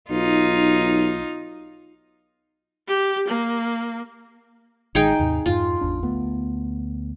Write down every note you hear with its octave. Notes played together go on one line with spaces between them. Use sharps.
B1 D#4 F4
G4
A#3
A1 D#3 G#3 D#4 G#4 G5
D#2 G#2 C3
F2 G#2 F4
G#1 E2 D4
D2 A3 B3